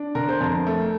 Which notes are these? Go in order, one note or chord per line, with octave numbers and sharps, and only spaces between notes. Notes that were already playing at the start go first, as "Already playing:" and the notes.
Already playing: D4
D3 A#4
C5
F2 A#4
A3